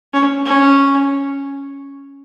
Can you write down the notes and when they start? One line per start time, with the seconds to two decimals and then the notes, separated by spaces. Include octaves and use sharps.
0.13 C#4
0.46 C#4